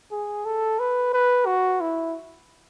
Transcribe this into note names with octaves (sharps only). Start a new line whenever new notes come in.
G#4
A4
B4
B4
F#4
E4